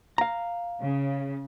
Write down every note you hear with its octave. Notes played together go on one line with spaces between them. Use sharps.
F5 A#5
C#3